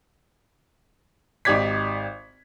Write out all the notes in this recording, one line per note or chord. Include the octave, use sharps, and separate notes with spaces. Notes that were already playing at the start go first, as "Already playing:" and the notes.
G#1 D#4 G4 D5 G#6 B6